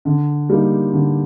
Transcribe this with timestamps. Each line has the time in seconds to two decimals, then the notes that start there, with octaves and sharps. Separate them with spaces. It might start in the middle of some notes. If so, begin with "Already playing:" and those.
0.05 D3
0.49 G3 A#3 D#4
0.93 D3